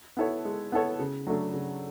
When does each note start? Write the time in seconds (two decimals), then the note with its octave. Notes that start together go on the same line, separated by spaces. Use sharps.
0.17 B3 E4 A4 C#5
0.45 G#3
0.72 B3 E4 A4 C#5
0.99 C#3
1.27 F#3 A3 D4
1.54 C#3